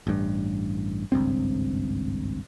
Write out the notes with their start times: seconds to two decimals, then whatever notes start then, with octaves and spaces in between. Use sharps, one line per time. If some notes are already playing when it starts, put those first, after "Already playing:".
0.07 A1 G2
1.12 G#1 C#2 G2 C4